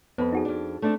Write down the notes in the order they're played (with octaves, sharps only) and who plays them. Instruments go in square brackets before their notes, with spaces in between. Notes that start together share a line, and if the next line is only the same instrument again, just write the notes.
[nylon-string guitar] F2 [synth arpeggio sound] B3 B4
[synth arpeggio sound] D#4 F#4 G#4
[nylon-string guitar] F2 D4
A3 C4 D4